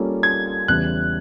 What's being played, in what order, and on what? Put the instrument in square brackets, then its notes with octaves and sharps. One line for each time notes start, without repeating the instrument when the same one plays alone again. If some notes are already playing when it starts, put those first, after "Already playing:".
Already playing: [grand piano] G3 A#3 C#4 F4 A4
[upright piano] G#6
[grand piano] E2 C#3 E3 G3 [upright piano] F#6